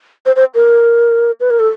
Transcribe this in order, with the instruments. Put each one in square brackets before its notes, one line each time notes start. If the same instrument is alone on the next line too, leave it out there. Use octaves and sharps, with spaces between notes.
[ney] C5
C5
A#4
B4
A#4
A4